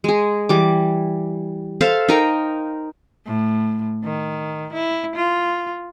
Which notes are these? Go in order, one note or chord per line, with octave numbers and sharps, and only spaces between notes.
G#3 G#4
E3 G3 D6
A4 C5 E5 F5
D#4 A#4 G5
A2
D#3
E4
F4